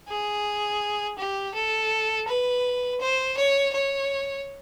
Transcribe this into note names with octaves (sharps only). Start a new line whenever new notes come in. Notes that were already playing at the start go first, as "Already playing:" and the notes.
G#4
G4
A4
B4
C5
C#5
C#5